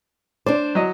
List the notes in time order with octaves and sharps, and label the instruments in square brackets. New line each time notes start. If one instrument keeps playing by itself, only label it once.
[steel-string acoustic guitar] D4 C5 [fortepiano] D5
[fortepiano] F#3 D#5